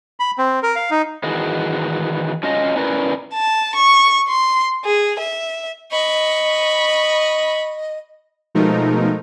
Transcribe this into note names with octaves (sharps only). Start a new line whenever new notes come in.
B5
C4
A#4
F5
D#4
D#3 E3 F#4 G#4
F#3 C#4 F4 D#5
C#4 E4 A#4 B4 D5
A5
C#6
C6
G#4
E5
D#5 B5 C#6
B2 F3 G#3 A3 D#4 A#4